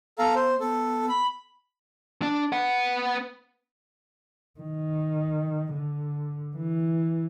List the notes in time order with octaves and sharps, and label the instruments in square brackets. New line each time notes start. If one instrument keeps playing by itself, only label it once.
[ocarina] B3 [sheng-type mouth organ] A4 F5 A#5
[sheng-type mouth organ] C5
[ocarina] B3 [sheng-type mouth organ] A4
[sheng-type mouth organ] B5
[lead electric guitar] D4
B3 F#5
[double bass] D#3
D3
E3